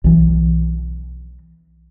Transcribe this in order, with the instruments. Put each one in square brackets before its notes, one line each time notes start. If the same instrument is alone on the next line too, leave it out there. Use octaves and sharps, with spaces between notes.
[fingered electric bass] B1 E3